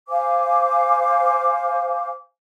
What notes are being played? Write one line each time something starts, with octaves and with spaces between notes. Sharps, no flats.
C5 F5 G#5 D6